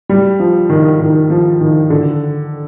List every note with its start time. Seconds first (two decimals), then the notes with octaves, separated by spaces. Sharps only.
0.09 G3
0.40 F3
0.70 D#3
1.00 D#3
1.30 F3
1.61 D#3
1.90 D3